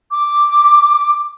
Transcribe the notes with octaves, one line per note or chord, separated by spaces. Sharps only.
D6